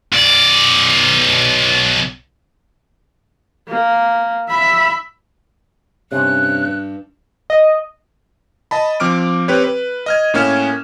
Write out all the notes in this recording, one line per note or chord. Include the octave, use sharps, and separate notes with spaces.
B1 D5
A#3
E5 B5
G2 C3 C#4 F#6
D#5
D#5 A5 B5
F3 C4 D6 F6 D7
C4 G4 B4 C#5
B4
D#5 F6 G#6
A2 A#3 C#4 F6 G#6 E7